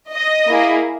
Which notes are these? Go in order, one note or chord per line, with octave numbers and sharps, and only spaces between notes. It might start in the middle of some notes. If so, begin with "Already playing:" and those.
D#5
A#3 E4 G#4